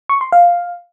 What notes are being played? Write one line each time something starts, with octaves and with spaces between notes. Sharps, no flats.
C#6
C6
F5